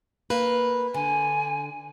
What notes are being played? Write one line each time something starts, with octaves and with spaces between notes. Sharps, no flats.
A#3 B4
D3 G#5